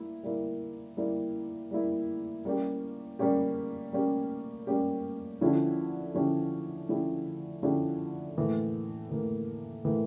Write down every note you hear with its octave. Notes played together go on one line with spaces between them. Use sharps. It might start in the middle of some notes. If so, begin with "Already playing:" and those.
Already playing: G3 A#3 E4
G3 A#3 E4
G3 A#3 E4
G3 A#3 E4
G3 A#3 C#4 G4
G3 A#3 C#4 G4
G3 A#3 C#4 G4
G3 A#3 C#4 G4
D3 F3 C#4 E4 G4
D3 F3 C#4 E4 G4
D3 F3 C#4 E4 G4
D3 F3 C#4 E4 G4
A2 E3 A#3
A2 E3 A#3
A2 E3 A#3